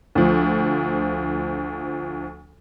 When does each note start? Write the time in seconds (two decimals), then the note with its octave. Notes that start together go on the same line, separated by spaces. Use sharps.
0.15 D2 F3